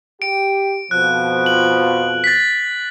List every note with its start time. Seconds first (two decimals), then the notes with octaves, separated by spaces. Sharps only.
0.22 G4 D7
0.91 F2 B2 F3 F#6
1.46 F#7
2.24 A6 B6